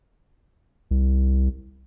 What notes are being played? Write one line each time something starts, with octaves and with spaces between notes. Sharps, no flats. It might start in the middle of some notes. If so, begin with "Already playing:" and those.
C2